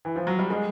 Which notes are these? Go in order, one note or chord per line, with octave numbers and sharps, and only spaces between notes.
E3
F3
F#3
G3
G#3